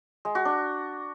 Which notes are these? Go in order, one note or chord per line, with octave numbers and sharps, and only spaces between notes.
G#3
F#4
D4